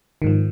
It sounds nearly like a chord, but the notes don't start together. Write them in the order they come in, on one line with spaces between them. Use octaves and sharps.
D#3 G#2 F3